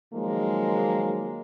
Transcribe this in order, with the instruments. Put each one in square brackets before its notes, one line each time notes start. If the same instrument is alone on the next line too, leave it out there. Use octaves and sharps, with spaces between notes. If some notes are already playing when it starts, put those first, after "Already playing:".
[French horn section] D#3 F3 F#3 G#3 A#3